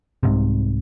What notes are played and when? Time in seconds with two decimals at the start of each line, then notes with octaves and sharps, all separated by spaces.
0.23 C2 G#2 C3